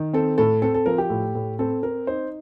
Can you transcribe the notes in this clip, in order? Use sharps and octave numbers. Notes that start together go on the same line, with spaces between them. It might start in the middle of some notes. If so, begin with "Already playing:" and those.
Already playing: D#3
C4 A4
A2 A4
C4 A4
A4
F3 A#4
G4
A2
A2
C4 A4
C4 A#4
D#4 C5